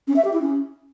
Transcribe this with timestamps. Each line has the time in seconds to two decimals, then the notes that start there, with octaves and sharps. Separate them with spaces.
0.07 C#4
0.16 E5
0.24 G4
0.33 E4
0.42 C#4